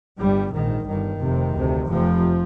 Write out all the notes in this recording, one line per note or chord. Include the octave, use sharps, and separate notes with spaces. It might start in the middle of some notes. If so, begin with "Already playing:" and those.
G1 G2 G3
A#1 G#2 D#3
G1 G2 D#3
F1 F2 C3
D2 C3
F1 F2 C3 F3